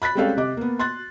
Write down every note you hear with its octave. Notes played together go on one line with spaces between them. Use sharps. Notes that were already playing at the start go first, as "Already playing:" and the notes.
B5 F#6 A6 B6
G3 G#3 C4 C#4 A4 F5
C3 D#5 D6
A#3 B3
C6 F#6 A6